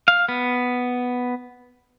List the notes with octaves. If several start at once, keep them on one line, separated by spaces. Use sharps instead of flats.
F5
B3